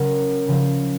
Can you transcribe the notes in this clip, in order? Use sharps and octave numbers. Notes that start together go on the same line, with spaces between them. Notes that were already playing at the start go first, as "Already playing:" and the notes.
Already playing: C#3 F#3 A#4
C#3 F3